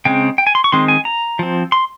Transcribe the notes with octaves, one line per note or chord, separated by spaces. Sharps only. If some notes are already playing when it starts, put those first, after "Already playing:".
C#3 G#3 C4 G5
G5
G#5
C6
C#6
D#3 G#3 C4 C6
G#5
A#5
F3 C4
C6